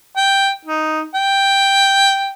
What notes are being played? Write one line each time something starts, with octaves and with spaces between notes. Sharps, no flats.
G5
D#4
G5